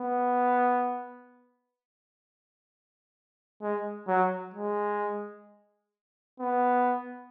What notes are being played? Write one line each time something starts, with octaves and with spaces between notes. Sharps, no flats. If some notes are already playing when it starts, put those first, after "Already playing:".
Already playing: B3
G#3
F#3
G#3
B3